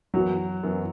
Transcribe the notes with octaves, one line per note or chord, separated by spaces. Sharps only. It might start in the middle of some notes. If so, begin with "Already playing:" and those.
F#2 E3 F#3 B3 F#4
F#2 E3 B3 F#4